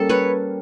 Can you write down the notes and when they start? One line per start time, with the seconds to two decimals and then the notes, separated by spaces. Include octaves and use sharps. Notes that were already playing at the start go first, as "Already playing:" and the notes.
Already playing: G3 A#3 C#4 A4
0.09 B4 C#5